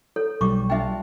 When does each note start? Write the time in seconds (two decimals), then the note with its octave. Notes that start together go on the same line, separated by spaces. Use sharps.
0.16 A4 C#5
0.41 B1 G3 C#6 D6
0.70 D4 F4 E5 G5